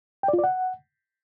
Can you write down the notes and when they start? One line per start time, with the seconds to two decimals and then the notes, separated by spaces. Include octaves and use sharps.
0.23 G5
0.28 D5
0.33 F4
0.39 D5
0.44 F#5